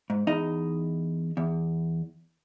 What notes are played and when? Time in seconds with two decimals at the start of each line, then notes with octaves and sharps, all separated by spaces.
0.10 G#2
0.27 E2 D#4 D#5
1.37 E2